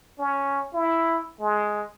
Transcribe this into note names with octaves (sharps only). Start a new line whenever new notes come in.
C#4
E4
G#3